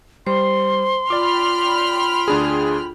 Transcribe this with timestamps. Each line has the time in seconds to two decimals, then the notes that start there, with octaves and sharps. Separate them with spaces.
0.27 G3 C5 C6
1.10 F4 D5 G5 B5 D6 F6
2.28 D2 D4 G#4